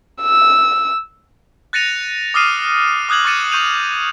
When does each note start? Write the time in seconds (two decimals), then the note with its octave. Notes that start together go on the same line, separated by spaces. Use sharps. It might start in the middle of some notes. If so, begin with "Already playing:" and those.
0.22 E6
1.73 F#6 A6 A#6 C#7 D#7 F7
2.34 D6 D#6 F6 C7 D#7
2.87 D#7
3.09 D6 D#6 F#6 G#6 F#7
3.25 C#6 D6 A6 C#7 D#7 E7
3.52 C#6 G6 D#7 F7